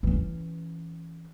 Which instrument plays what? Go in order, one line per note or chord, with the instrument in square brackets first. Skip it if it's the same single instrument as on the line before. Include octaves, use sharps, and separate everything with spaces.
[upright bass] E3 C#4